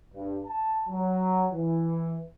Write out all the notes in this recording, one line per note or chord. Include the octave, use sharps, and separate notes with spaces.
G2
A5
F#3
E3